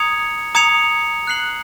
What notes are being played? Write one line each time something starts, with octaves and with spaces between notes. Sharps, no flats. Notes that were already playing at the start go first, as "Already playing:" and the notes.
Already playing: A#5 D#6 G#6 C#7 F7
A#5 D#6 G#6 C#7 F7
F#6 C7 F#7